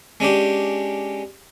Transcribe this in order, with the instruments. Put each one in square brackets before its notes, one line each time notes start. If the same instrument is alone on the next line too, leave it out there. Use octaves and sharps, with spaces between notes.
[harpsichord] G#3 C#4 D4 G4